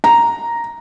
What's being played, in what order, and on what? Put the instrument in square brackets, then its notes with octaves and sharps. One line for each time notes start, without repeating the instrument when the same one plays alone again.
[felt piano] A#5